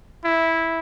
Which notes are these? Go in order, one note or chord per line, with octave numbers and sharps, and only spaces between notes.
E4